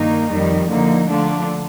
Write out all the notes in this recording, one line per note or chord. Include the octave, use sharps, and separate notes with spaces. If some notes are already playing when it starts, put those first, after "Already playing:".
Already playing: G2 D#3 A#3 D#4
F2 D#3 G3
D3 F3 A#3 D#4
D3 F3 A3 D4 F4